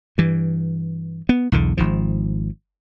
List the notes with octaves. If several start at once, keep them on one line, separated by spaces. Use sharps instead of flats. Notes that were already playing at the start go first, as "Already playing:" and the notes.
G2 E3
B3
B1 E2 D3
G#1 G#2 F3